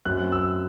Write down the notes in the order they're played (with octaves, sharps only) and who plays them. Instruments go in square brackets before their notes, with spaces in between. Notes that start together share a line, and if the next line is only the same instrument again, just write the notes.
[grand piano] F#2 F#3 C4 F#6
E6